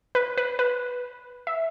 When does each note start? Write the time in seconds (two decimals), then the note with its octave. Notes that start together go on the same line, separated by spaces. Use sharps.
0.15 B4
0.37 B4
0.59 B4
1.47 E5